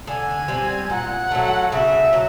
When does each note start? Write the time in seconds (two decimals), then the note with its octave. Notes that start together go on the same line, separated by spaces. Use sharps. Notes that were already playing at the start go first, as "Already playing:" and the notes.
0.07 D3 G#5
0.48 G3 C4
0.90 A#2 F#5
1.31 F#3 A3
1.72 C#3 E5
2.13 F#3